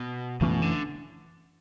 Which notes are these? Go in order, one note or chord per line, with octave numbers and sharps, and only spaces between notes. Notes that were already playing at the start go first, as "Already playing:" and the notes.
Already playing: B2
F#2 B2 E3 A3 C#4
D3